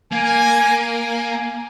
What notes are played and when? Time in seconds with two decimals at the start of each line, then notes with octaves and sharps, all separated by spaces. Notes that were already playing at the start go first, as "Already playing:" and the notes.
0.12 A#3 G#5
0.76 G#5